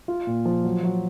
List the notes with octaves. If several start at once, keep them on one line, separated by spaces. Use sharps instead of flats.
F4
A#2
F3
F#3
F#3